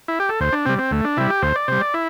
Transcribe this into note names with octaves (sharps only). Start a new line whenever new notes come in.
E4
G4
A4
D2 C5
D4
C3 G3 C4
C4
D2 A3
D4
C3 G3 E4
G4
D2 C5
D5
C3 G3 C5
D5
E4